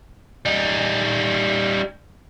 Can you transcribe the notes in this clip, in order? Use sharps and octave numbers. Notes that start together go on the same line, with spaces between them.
G3 D#4